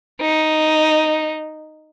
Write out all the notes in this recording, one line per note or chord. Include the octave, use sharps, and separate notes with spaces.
D#4